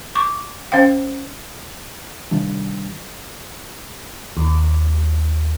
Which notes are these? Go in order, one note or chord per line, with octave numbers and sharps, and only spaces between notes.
C#6 D6
C#4 C5 F5 G5
C3 D#3 G3 D4
D#2